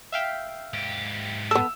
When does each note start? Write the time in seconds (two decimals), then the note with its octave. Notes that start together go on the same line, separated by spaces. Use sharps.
0.12 E5 F5 G5
0.74 G#2 G4
1.51 B3 A4 E6